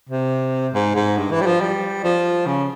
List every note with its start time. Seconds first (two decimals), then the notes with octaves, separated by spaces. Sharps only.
0.10 C3
0.74 G#2
0.96 G#2
1.17 G2
1.31 E3
1.41 G3
1.46 F3
1.61 G3
2.04 F3
2.46 C#3